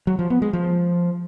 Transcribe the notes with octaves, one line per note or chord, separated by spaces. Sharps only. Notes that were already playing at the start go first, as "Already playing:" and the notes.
F#3
F3
B3
G#3
F3